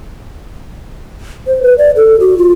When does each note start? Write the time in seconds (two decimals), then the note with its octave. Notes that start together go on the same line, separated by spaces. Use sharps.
1.47 C5
1.63 B4
1.78 D5
1.96 A4
2.20 F#4
2.38 F4